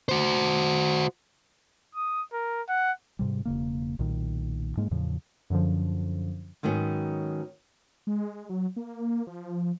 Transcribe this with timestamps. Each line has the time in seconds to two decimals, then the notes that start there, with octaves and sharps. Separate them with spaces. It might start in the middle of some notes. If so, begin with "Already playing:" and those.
0.09 F#4 C5
1.95 D#6
2.33 A#4
2.69 F#5
3.19 G#2 C3 G3
3.45 E1 C#3 A#3
3.99 B1 A#2 D#3
4.77 G#2 G#3 A#3
4.91 E2 A2 C#3 F3
5.50 F#2 D3 F3
6.63 G#2 D#3 F#3 A#3 B3 C#4
8.07 G#3
8.50 F#3
8.76 A#3
9.27 F3